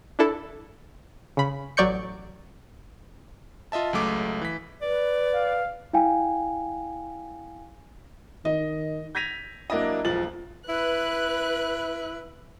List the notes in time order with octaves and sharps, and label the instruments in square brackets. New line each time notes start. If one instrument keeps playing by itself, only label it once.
[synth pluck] D4 E4 A4
C#3 B5
A1 F#3 D5 C#6 G6 C#7
[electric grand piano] F4 D#5 E5 A5
C#2 F#3 G#3 A3 D6
E3 B6
[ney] B4 [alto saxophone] D5
[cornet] F5
[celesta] E4 F5 G5 G#5
[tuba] D#3 [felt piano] D#5
[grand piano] G6 G#6 A#6 B6 D#7 F7
F#3 A#3 D4 E4 D#5
E1 B1 F3 A6 F#7
[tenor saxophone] E4 [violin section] B4 F#6